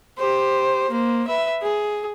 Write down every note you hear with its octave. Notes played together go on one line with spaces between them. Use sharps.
G4 C5
A#3 C5
B4 E5
G#4